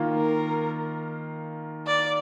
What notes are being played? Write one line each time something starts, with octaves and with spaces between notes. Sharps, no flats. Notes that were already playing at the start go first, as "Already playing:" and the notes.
Already playing: D#3 A#3 F4
A#4
D5